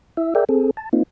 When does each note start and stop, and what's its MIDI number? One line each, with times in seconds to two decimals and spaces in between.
0.17 0.34 64
0.17 0.34 76
0.35 0.44 68
0.35 0.44 70
0.35 0.44 74
0.35 0.44 76
0.35 0.44 79
0.49 0.71 60
0.49 0.71 68
0.49 0.71 69
0.77 0.89 81
0.93 1.03 58
0.93 1.03 60
0.93 1.03 63
0.93 1.03 65